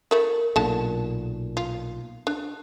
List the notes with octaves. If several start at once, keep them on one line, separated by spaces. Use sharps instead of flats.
A3 E4 A#4
B1 A#2 D3 A5
F4
D4